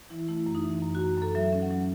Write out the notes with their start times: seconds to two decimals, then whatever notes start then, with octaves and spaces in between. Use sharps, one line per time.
0.10 E3 E4
0.28 A3 E4
0.46 F#2
0.55 D#4
0.64 E3
0.82 F#2
0.95 F#2 F#4
1.17 F#2 A4
1.35 F#3 E5
1.53 C#4
1.62 F#5
1.70 F#3